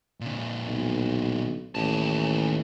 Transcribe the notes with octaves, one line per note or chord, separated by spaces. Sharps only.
A#2 D3
B1
A1 D#2 A5